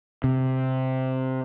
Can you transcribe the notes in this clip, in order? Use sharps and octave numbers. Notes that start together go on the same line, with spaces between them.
C3